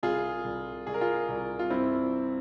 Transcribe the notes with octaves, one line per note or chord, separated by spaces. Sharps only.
C2 F4 G#4
C2
C2 G#4
A#4
F4 G#4
C2
F4
G2 C4 E4